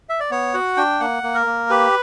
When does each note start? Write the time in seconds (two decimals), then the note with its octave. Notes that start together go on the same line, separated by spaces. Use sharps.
0.09 E5
0.20 D5
0.31 B3 C#5
0.54 F#4 F#5
0.77 D4 G5
1.00 A#3 F#5
1.23 A#3
1.35 A#4
1.46 A#3
1.70 G4 B4